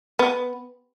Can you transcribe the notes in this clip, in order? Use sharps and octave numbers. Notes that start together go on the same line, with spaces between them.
B3